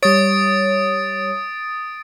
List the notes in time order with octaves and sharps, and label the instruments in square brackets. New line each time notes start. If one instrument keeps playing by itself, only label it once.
[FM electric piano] G3 C#5 [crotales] D#6 A6 D7